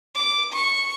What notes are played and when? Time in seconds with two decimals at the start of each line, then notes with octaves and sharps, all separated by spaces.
0.15 D6
0.53 C#6